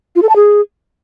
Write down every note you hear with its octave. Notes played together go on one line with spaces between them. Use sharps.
F4
A4
A5
G#4